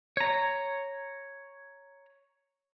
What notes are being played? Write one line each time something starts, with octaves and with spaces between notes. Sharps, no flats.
C#5 A#5